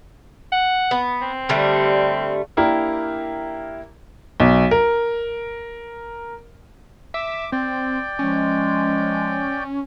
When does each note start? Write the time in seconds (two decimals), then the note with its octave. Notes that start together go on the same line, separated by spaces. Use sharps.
0.52 F#5
0.91 B3
1.21 C4
1.49 D3 G3 A3
2.57 A#3 D4 E4 G4 A#4
4.40 B1
4.71 A#4
7.14 E5 D6
7.52 C4 D5 G5
8.19 F3 G#3 C#4